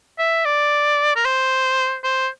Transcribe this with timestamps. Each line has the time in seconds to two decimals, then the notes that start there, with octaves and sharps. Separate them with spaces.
0.19 E5
0.45 D5
1.16 A#4
1.25 C5
2.04 C5